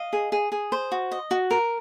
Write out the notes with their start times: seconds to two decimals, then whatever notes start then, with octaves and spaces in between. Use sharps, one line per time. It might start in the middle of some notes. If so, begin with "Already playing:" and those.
Already playing: D#5 F5
0.13 G#4
0.32 G#4
0.52 G#4
0.72 C5
0.92 F#4
1.11 D#5
1.31 F#4
1.51 A#4